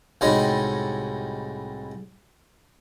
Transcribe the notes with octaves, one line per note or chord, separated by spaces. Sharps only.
C2 A2 G3 G#3 D#4 F#4